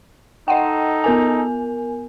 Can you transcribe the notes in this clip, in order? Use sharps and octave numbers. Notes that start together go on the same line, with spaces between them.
D#4 A4 D#5 F#5 G5
B3 A#4 G#5